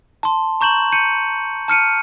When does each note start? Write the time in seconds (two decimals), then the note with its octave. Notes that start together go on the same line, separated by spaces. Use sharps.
0.23 A5 C6
0.61 A#5 C#6 G6 E7 F#7
0.92 G6 C#7 D#7
1.68 A5 F6 C#7 D#7